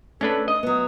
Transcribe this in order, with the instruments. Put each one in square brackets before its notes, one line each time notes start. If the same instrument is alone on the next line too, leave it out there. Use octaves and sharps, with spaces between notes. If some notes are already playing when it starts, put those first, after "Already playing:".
[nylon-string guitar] A3 [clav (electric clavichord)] C#4 D4 B4 [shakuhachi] A4
[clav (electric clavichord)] D#5 [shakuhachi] D#6
[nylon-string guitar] F#3 B3